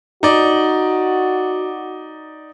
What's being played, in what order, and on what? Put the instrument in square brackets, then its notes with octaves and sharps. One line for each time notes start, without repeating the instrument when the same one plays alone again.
[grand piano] D#4 D5 [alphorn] F#4